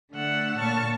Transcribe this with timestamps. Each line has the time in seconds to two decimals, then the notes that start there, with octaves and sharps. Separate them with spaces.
0.12 D3 A3 F#5 E6
0.59 A#2 C#5 A5 C#6 F6